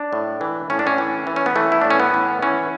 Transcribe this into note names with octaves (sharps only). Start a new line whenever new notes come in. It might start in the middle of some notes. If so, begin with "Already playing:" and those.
Already playing: D4
A2
E3
A2 C#4
D4
C#4
E3
E3
C#4
B3
E3 A3
E4
A2 D4
C#4
B3
E3
E3 C#4